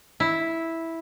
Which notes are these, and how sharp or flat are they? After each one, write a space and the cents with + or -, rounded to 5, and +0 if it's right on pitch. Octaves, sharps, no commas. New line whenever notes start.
E4 -5